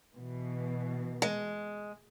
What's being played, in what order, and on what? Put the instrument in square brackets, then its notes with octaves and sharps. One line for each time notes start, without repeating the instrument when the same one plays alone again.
[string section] B2 E3
[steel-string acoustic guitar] G#3